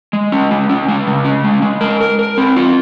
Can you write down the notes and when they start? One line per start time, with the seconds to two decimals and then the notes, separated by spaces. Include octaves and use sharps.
0.13 G#3
0.32 C#4
0.51 G#3
0.70 C#4
0.88 G#3
1.07 C#3
1.25 C#4
1.44 G#3
1.62 G#3
1.81 A#4
2.01 A#4
2.19 A#4
2.38 C4
2.56 F4